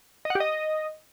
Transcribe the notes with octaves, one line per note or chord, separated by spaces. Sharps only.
D#5
F#5
G4
D#5